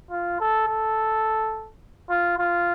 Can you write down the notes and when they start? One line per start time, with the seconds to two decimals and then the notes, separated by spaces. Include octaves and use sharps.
0.11 F4
0.40 A4
0.68 A4
2.10 F4
2.38 F4